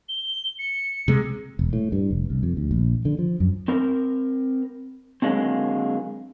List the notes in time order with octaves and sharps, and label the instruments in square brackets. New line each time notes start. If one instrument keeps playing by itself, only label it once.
[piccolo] G7
C#7
[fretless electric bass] C3 G#3
[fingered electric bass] E1
A2
G2
F1
C2
F2
D2
A#1
D3
F3
F#2
[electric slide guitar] C4 A#4
D3 F#3 G#3 A#3 C4